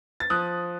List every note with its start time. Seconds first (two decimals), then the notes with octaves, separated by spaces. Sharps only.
0.20 A6
0.30 F3 D#6 F#6